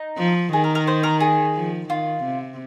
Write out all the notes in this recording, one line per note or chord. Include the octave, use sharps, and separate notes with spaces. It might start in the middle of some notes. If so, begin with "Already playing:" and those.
Already playing: D#4
F3
D#3 G#4
A#4
A#4
C5
A#4
G#4
F3
D#3 F4
C3